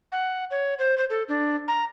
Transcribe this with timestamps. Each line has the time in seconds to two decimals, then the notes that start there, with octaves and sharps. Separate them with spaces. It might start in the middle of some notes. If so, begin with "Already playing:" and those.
0.12 F#5
0.51 C#5
0.79 C5
0.98 C5
1.10 A4
1.29 D4
1.68 A#5